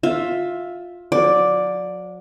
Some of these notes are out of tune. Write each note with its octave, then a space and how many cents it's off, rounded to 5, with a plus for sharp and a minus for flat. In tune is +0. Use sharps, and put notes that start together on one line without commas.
F4 +15 E5 +0
F#3 -40 D5 +0